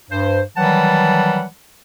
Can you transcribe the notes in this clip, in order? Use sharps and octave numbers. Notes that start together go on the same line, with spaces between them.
G2 C5
D#3 E3 F#3 G3 F#5 A5